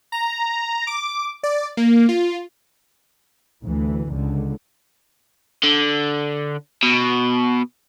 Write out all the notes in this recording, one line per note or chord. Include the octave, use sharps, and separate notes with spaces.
A#5
D6
D5
A#3
F4
D2 E3
C#2 D3
D3
B2